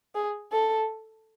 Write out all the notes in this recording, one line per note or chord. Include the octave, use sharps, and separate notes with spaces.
G#4
A4